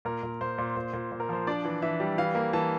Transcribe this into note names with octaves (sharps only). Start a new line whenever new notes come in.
A#2 A#4
A#2
A#2 C5
A#2
A#2 C5
A#2
A#2
A#4
F3 C5
D4 D5
E3
E3 E5
G3
E3 F5
A#3
E3 A5